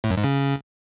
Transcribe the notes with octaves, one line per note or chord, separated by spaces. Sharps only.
A2
F#2
G#2
C#3